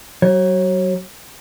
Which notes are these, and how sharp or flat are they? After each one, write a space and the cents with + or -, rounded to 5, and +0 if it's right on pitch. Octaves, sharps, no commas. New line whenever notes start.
F#3 +30 C#5 -30